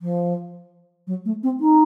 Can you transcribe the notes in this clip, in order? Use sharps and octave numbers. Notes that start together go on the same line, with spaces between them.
F3
F#3
A3
C4
D#4